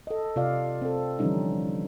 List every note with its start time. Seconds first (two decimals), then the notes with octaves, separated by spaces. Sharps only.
0.07 A4 D#5
0.36 C3 F4 D5 F5
0.82 C4 A4
1.19 D3 E3 F3 G3 C#4 D#4